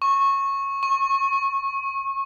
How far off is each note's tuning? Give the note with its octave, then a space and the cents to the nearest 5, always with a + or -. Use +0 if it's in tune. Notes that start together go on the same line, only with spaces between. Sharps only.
C#6 -15
C#6 -30